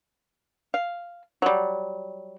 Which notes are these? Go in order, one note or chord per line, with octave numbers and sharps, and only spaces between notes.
F5
F#3 G3